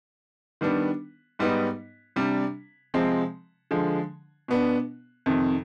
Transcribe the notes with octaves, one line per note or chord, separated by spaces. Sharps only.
D#3 G3 B3 D4
G#2 G3 B3 D#4
C3 G3 D4
C3 F3 G#3 C4
D3 F3 G#3
B2 B3 D4
F2 C3 D#3